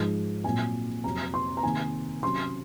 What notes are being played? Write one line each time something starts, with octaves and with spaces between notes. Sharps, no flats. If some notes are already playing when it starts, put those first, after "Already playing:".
Already playing: G#2 F3 G#3
A#2 F#3 C4 G#5
F2 C3 F#3 C4 A#5
C6
A#5
C3 D#3 A#3 G#5
C3 F#3 C#4 C6